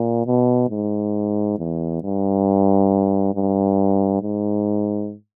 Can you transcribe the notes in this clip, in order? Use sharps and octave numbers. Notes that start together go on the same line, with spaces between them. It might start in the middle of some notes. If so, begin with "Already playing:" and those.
Already playing: A#2
B2
G#2
E2
G2
G2
G#2